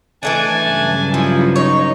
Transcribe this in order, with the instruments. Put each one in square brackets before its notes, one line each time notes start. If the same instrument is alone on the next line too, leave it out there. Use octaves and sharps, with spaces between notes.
[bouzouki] E3 A3 D4 [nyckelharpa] G#5 A5
[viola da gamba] G2 C#3 F#3
[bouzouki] F3 [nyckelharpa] E4
[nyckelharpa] D#4 [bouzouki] C#5